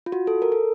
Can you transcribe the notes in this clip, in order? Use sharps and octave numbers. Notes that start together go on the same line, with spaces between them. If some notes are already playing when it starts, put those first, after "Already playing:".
F4
F#4
A4
A#4
A4